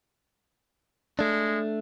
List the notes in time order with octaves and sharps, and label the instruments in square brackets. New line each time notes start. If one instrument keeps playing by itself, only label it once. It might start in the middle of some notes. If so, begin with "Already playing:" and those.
[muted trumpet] G#3 [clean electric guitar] A3 D4